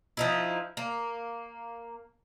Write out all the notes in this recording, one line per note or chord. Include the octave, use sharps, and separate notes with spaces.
F3 D#4 E4
A#3